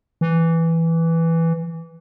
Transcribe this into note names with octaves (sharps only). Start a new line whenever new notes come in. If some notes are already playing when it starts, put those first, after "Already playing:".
E3